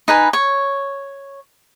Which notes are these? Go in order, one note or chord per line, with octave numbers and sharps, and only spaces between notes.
D#4 B4 G#5
C#5